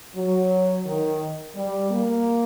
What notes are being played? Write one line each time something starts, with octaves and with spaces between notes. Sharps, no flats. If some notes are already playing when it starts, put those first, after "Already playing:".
F#3
D#3
G3
A#3